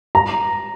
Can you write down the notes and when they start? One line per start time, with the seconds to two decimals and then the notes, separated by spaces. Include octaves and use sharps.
0.15 A#5